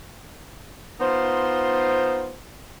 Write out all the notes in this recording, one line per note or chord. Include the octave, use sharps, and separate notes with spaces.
B3 D#4 F4 C5